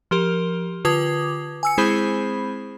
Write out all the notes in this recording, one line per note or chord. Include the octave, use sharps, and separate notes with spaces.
F3 G4 A#4
D3 F4 B4 D6 D#6 G#6
G#5 E6 C#7
G#3 C4 E4 G#4 C5 B5